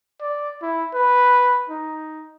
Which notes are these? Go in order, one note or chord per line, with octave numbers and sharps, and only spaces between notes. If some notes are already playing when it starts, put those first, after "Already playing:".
D5
E4
B4
D#4